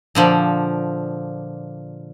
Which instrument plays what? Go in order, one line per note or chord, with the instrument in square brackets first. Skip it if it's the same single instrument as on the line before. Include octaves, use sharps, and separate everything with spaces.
[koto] A#2 D3 F3